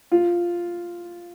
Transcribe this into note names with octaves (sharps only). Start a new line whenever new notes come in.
F4